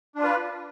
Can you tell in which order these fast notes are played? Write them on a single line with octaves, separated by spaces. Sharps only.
D4 F4 B4